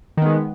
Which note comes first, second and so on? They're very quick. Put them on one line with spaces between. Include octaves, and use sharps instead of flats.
D#3 B3 G#3